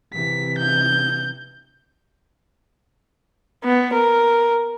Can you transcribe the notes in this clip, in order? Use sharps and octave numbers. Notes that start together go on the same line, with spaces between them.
C3 E3 B6
G6
B3
A#4